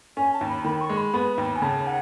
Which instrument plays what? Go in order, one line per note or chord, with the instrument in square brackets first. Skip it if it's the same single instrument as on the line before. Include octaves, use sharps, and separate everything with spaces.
[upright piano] C#4 [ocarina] G#5
[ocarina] A5
[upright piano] D#2
[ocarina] B5
[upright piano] D#3 [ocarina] B5
[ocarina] C#6
[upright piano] G#3
[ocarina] B5
[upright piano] B3
D#2
[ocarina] G#5
[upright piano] C#3 [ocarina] A5
[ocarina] F#5